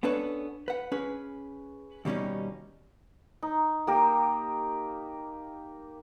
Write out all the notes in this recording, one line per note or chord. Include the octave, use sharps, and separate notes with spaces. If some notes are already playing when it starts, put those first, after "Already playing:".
B3 C#4 D4 A4 B4 C#5
B4 F#5
C#4 G#4 B4
D#2 B2 G3 C#4 D#4
D#4
A#3 G4 A#4